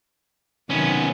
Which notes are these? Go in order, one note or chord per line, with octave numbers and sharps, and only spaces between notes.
C3 D#3 F#3 B3 C#4